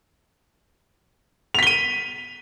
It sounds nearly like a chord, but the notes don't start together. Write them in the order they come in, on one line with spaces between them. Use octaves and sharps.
F7 B6 G7 D#7